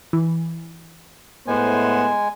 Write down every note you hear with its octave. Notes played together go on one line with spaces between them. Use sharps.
E3
A2 G#3 B3 C5 G#5